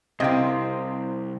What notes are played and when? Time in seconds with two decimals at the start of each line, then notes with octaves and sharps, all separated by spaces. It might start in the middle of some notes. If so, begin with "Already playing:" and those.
0.20 C2 C3 C4 D#5 F5